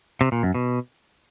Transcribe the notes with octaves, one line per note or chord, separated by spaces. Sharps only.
C3
A#2
F#2
B2